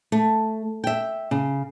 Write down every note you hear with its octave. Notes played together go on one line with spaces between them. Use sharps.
A3
E5 G5
C#3